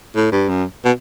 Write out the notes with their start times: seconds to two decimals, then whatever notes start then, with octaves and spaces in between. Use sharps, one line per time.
0.16 A2
0.32 G2
0.49 F#2
0.85 B2